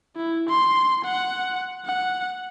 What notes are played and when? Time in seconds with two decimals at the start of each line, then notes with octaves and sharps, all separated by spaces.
0.16 E4
0.49 C6
1.05 F#5
1.86 F#5